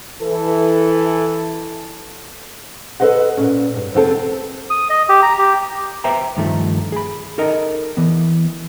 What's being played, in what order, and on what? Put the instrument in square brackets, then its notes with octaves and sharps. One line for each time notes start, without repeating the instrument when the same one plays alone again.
[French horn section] E3 A4
[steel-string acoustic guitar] A4 B4 C5 D#5 F#5
A#2 C#4
G2
F2 C3 B3 C4 F4 A4
[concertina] D#6
D#5
G4
A#5
G4
[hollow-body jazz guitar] B4 C5 E5 G5 A#5
G2 D#3 F3 A3
G#4 B5
D#4 A4 A#4 D#5
E3 B3